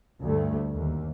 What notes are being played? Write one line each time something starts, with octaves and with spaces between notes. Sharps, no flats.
D2 G2 A3
D#2